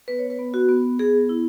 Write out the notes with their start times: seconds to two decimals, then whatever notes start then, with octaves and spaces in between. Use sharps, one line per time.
0.08 B3 B4
0.19 C#5
0.30 B4
0.39 B3
0.54 F#4
0.69 B3
0.99 B3 G#4
1.29 E4